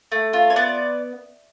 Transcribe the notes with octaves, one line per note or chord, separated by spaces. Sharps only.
A3
F4
C#5
B3 D5